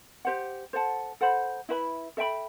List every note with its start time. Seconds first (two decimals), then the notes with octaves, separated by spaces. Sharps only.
0.25 G4 C5 F#5
0.73 A4 C5 F#5 A5
1.21 A4 C5 F#5 B5
1.69 E4 B4 E5 B5
2.17 A4 E5 G5 B5